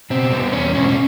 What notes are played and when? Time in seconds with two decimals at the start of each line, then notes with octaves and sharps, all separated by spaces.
0.10 B2 C4
0.32 G3 B3
0.53 E2 C#4
0.75 B2 G#3 C4 C#4
0.88 C#4